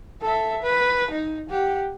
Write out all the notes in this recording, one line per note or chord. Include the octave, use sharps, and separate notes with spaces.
A4 E5
B4
D#4
G4 F#5